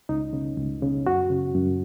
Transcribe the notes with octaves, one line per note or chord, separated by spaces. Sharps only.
C#2 D#4
C#3
C#2
C#3
F#2 F#4
C#3
F#2